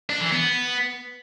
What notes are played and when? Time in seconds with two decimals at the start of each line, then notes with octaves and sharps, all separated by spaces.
0.10 D4
0.21 E3
0.32 B3